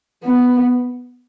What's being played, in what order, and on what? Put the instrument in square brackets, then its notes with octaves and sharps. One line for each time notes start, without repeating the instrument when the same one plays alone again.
[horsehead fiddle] B3